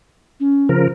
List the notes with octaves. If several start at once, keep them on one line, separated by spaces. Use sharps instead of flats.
C#4
C#3 F3 A#4